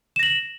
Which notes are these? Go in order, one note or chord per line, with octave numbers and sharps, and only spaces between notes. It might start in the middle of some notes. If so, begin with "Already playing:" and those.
A#6 E7 F#7